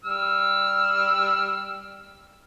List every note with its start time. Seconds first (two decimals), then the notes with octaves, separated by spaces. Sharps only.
0.04 G3 E6 F6